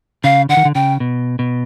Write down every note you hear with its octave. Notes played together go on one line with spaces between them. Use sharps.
C#3 F5
D3 F#5
D#3
D3
C#3 G5
B2
B2